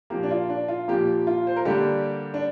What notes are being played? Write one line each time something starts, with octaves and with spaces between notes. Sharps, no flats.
A#2 F3 A#3 G4
D4
F4
D4
F4
A#2 F3 A#3 G4
F4
C5
A#4
D3 G3 A#3 G4
D4